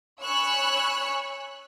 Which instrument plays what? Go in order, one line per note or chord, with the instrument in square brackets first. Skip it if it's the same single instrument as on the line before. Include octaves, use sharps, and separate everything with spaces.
[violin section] C#5 G#5 B5 C#6 E6 F#6